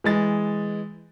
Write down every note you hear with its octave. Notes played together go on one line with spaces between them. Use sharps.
E3 G#3 A6